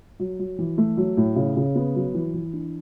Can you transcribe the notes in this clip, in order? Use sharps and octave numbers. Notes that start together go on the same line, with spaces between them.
F#3
F#3
E3
A3
F#3
A2
C#3
C#3
B3
F#3
E3
E3
D4